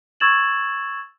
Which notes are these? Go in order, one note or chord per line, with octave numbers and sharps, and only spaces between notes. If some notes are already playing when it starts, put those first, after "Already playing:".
C#6 E6 G#6 A6 E7 F#7